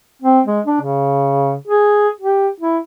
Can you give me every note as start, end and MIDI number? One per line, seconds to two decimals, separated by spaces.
0.22 0.40 60
0.47 0.61 56
0.66 0.78 62
0.81 1.54 49
1.68 2.09 68
2.21 2.48 67
2.60 2.79 64